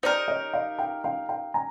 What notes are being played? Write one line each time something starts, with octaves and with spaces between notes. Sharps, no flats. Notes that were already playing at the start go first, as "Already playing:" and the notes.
D#4 G4 A#4 C5 D5
C#5 D#5
D#5 F5
F5 G5
F5 G5
F5 G5
G#5 A#5